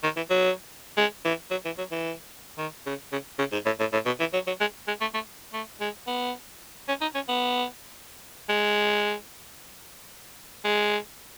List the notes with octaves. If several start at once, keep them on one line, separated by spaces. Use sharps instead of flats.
D#3
E3
F#3
G#3
E3
F#3
E3
F#3
E3
D#3
C#3
C#3
C#3
G#2
A2
A2
A2
B2
E3
F#3
F#3
G#3
G#3
A3
A3
A3
G#3
B3
C#4
D#4
C#4
B3
G#3
G#3